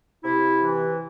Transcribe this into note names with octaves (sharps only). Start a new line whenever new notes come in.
C3 E4
E3